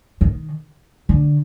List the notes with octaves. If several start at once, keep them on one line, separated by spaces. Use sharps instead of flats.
D#3
D3